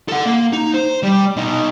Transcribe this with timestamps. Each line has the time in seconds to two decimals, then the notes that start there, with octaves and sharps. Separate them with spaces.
0.08 A4 F#5
0.26 A#3
0.53 D#4
0.74 C5
1.03 G3
1.36 B2 D#4